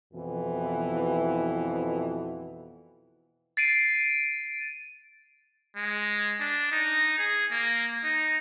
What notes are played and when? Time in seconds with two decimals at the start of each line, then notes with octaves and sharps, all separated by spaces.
0.14 F2 B2 E3
3.57 A6 C7 D7 D#7
5.77 G#3
6.40 D4
6.72 D#4
7.18 G#4
7.52 A#3
8.04 D#4